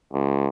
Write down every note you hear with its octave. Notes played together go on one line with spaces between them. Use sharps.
C#2